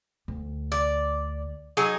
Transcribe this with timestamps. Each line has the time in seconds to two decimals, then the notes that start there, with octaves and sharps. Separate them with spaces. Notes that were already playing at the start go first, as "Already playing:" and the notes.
0.28 D2
0.72 D5
1.77 F#3 D#4 G#4